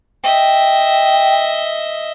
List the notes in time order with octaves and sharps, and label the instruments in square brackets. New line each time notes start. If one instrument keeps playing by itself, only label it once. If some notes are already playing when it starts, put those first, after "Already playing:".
[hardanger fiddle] D#5 E5 [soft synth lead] G5